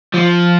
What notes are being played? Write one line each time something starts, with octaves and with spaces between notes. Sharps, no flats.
F3